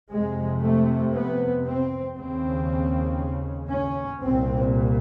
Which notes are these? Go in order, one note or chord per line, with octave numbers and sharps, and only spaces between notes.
F2 C3 G#3
A3
B3
C4
D#2 C#3 C4
C#4
C2 A#2 C4